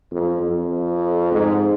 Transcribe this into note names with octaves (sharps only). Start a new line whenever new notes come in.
F2
F2
G#2